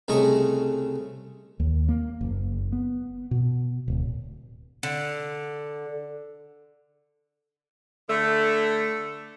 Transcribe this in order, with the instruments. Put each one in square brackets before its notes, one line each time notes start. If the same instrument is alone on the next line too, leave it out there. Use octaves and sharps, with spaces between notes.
[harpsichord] C2 C#3 A3 D#5 A#5 C#6
[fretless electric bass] D#2
A#3
F#1
B3
B2
D1
[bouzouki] D3
[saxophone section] D3 A3